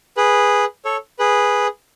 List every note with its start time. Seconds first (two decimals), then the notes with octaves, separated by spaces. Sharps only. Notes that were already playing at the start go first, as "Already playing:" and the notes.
0.17 G#4 B4
0.85 A4 C#5
1.19 G#4 B4